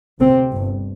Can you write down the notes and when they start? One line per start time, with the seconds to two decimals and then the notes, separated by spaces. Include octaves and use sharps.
0.20 D2 C3 C4
0.53 G1 G2